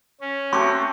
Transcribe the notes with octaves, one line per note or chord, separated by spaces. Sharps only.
C#4
A3 C4 F#4 C#6 D6